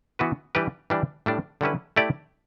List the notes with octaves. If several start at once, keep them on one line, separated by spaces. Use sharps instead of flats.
E3 B3 F#4 B4
E3 G3 D4 G4 B4
E3 G3 D4
A2 G3 D4
D3 G3 C#4 E4 B4
A3 E4 G4 D5